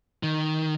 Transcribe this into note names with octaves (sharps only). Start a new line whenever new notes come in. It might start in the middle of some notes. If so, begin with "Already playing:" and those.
D#3